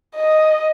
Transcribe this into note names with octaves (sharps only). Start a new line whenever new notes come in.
D#5